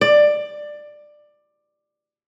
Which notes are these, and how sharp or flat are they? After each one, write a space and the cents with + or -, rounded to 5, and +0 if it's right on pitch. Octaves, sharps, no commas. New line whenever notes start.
D5 +15